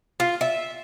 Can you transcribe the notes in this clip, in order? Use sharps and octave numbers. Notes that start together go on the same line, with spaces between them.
F4
E5